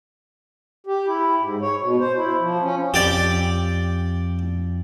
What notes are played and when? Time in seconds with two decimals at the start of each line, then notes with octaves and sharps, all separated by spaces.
0.87 G4
1.07 E4
1.40 G#2
1.61 C#5
1.80 B2
2.00 C5
2.16 E4
2.39 F3
2.62 C#4
2.94 F2 G4 D5